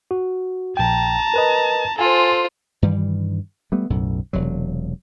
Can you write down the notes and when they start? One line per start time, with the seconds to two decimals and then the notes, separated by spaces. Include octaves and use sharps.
0.11 F#4
0.77 A#1 G5 A5 A#5
1.34 A#4 B4 D#5
1.99 F4 A4 C5 G#5
2.82 G2 D#3 E3 G3
3.72 G3 A3 B3
3.90 B1 F#2 A2
4.33 E1 C3 F#3